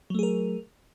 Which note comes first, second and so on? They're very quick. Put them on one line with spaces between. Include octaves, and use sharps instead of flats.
F#3 A3 G#4 A#4